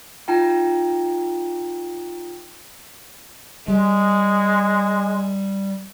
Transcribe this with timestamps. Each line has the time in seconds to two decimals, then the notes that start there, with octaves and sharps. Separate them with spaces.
0.28 D#4 F4 G5 A5 A#5
3.68 G3 G#3